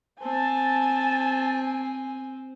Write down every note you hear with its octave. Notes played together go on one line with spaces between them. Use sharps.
C4 G#5 A5